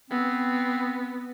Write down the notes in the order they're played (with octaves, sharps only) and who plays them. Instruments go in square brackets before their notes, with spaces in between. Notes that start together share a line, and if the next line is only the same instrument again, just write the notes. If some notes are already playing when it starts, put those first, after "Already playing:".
[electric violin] B3 [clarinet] C4